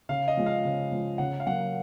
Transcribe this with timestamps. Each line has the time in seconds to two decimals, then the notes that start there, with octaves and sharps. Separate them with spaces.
0.09 C#3 F5
0.28 D#5
0.37 F3 G#3
0.46 F5
0.65 C#3
0.92 F3 G#3
1.18 C#3 F#5
1.40 F5
1.47 F#3 A#3 F#5